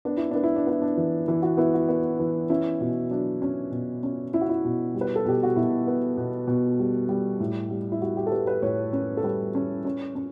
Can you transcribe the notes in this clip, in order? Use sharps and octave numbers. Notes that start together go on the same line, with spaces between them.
B3 D4
E4
B3 D4
E4
D4
B3 E4
D4
E3
E3 E4
F#4
B3 E4
F#4
B3
E3
C#4 E4
B2
F#3 D4
C#4
B2
C#4
C#4 E4
F#4
E4
B2
G3
B4
A4
B2 G4
F#4
B2 E4
B3
B2
B2
G3
G3
A2
G3
E4
G3 F#4
G4
A4
G3 B4
B4
A2 C#5
C#4
A4
G3 B4
C#4
C#4
C#4